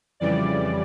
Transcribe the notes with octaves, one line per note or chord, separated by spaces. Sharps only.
F2 C#3 E3 G3 D5